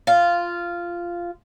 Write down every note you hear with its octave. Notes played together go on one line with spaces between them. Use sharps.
F4